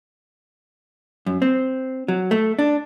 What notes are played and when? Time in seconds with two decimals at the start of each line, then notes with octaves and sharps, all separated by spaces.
1.26 F#2
1.42 C4
2.08 F#3
2.31 A3
2.59 D4